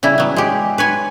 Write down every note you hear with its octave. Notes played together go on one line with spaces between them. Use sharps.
C#3 G3 E4
F#3 B3
G#3 G4
B4 C#5 G#5